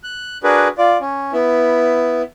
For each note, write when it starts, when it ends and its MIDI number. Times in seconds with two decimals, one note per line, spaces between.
0.04 0.38 90
0.44 0.68 62
0.44 0.68 66
0.44 0.68 68
0.44 0.68 70
0.44 0.68 71
0.78 0.97 65
0.78 0.97 74
1.01 1.32 61
1.33 2.22 59
1.33 2.22 64